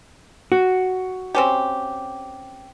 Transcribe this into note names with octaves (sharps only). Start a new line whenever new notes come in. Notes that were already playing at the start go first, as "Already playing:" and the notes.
F#4
C4 C#4 G4